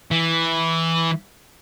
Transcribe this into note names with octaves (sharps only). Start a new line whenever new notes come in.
E3